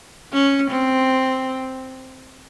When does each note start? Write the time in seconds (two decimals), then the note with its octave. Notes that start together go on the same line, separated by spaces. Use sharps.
0.33 C#4
0.71 C4